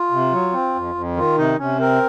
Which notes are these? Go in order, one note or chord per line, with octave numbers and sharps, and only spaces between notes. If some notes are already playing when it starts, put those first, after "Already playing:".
Already playing: F4
C3
F#3
C4
F2
F2
D#3 F4
C3 D#4
C3 C#4
C4 A#4